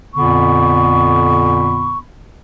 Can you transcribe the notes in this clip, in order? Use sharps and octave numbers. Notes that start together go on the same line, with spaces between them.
F2 A#2 D3 B3 B5 C#6